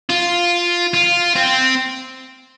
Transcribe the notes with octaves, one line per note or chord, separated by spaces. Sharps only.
F4
F4
C4